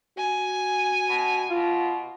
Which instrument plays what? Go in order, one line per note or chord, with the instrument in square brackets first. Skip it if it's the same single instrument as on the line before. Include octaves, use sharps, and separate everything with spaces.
[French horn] F#4 [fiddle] G#5
[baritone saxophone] B2
[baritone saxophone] B2 [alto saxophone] F4